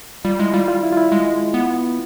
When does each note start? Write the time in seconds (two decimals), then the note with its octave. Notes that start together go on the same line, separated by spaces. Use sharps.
0.25 G3 F4
0.40 G#3 E4
0.53 G3 F4
0.68 F4
0.83 E4
0.92 F4
0.97 E4
1.12 G#3
1.54 B3